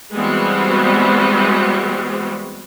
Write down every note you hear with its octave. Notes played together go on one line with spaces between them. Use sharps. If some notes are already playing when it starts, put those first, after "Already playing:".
E3 G3 G#3 B3 C4 F#4